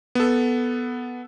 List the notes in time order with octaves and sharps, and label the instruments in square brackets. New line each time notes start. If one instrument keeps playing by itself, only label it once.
[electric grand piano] B3 A4